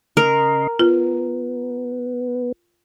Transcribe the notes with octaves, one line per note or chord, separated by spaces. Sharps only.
C#3 A#4 D#5 C6
B3 F4